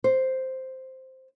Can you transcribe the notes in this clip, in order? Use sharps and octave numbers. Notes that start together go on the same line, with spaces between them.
C5